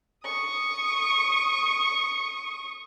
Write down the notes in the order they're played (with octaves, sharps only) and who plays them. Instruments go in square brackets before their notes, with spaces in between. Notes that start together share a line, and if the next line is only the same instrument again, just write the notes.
[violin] C#6 D#6